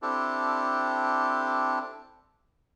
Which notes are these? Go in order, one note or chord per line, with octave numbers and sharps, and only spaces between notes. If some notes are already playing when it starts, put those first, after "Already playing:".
C4 D4 E4 G4 A4